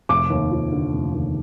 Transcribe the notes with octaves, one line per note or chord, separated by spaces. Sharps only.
F1 D6
D#2
F3
D3
F1
D#2